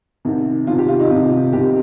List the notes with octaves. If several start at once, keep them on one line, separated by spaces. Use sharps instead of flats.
C2 C3 D#3
C2 C3 D#3 F4
G4
F4
D#4
C2 C3 D#3 F4
C2 C3 D#3 G4